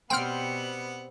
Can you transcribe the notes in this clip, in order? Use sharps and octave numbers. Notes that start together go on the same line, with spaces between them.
B2 G3 B3 C4 C5 F#5 G5 F6